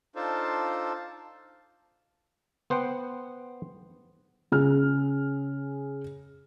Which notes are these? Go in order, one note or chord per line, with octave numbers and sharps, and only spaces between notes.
D4 D#4 F4 A4 C5
B3 C5 F#5 G5
C#3 G#4 F6